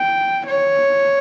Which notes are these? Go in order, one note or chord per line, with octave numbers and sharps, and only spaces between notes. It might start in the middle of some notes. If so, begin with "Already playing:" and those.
Already playing: G5
C#5